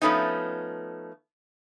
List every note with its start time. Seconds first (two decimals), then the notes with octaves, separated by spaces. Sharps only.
0.02 F3 A3 B3 C#4 D#4